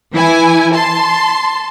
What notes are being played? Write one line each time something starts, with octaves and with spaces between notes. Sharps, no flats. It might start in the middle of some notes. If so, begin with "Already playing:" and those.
E3 E4 G#5
A5 C6